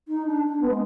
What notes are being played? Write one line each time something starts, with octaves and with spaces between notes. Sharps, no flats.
D#4
D4
D4
B3
G#3